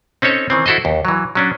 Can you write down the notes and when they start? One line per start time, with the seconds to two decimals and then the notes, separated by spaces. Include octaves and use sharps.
0.22 C4 C#4 D#4 A4 C#5
0.50 D#3 E3 C4
0.66 E4 F#4 A4 C5 D#5
0.85 D#2
1.05 E3 F#3
1.35 F#3 C#4 D4